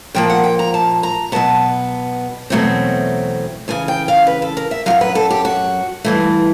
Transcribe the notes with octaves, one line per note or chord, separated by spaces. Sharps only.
A#2 F3 A#3 G5
F#5
G5
A#5
A5
A#5
B2 F#3 B3 A5
E2 B2 F#3 A3 C4
E2 C#3 E3 G#5
G5
F5
B4
A4
A#4
E5
F#2 D#3 F#3 F5
B4
A4
G4
F#4
G2 E3 A3